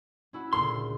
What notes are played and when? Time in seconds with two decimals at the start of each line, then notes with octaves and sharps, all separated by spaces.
0.33 C#4 E4 F#4
0.53 D2 A#2 C#3 C6